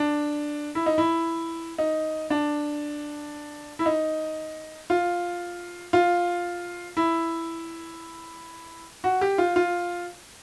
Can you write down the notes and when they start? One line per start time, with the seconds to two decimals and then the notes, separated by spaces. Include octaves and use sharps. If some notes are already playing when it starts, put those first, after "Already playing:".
Already playing: D4
0.75 E4
0.86 D#4
0.98 E4
1.78 D#4
2.30 D4
3.79 E4
3.86 D#4
4.90 F4
5.93 F4
6.97 E4
9.04 F#4
9.21 G4
9.38 F4
9.56 F4